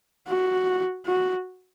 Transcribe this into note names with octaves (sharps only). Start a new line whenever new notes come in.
F#4
F#4